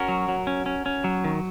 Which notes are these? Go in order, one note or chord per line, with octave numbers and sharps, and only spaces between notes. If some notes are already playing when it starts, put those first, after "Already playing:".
Already playing: C#4 F#4 A#4
F#3
F#3
C#4
C#4
C#4
F#3
D#3